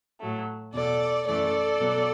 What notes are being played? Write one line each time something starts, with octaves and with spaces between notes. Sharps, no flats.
A2 F#3 A3
E2 B2 F#3 A4 D5
F#2 E3 A3 A4 D5
B2 F#3 B3